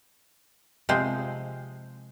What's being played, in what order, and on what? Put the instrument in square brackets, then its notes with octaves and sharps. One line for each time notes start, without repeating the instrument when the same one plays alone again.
[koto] C3 F3 G#3 C5